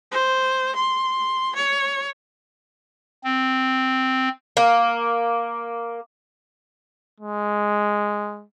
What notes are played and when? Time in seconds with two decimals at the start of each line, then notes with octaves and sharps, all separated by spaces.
0.12 C5
0.75 C6
1.55 C#5
3.24 C4
4.57 A#3
7.20 G#3